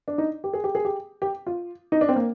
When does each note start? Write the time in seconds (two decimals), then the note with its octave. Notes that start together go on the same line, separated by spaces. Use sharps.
0.08 D4
0.18 D#4
0.44 G4
0.53 G#4
0.64 G4
0.75 G#4
0.85 G4
1.22 G4
1.46 F4
1.92 D#4
2.01 D4
2.09 C4
2.16 A#3